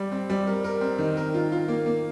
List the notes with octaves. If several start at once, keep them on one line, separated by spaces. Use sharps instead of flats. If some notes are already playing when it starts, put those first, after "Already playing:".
Already playing: G3
C4
G3
A#4
A#4
C4
D#3
A#4
F4
F4
A#3
A#3